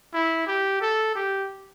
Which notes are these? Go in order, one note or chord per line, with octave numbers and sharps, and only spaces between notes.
E4
G4
A4
G4